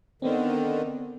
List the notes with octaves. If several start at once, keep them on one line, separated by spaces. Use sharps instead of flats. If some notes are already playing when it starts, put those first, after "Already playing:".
D3 D#3 B3 C4